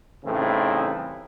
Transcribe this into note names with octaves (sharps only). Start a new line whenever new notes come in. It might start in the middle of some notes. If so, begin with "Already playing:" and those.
A2 C#3 E3 G3 C4 D#4